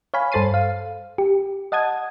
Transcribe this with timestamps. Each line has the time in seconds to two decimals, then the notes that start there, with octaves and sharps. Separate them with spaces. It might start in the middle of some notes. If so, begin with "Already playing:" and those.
0.14 C#5 F5 G#5 B5
0.32 G2 A4 C5 A6 C7 D#7
0.54 F5
1.18 G4
1.72 D#5 F#5 A5 D#6 G#6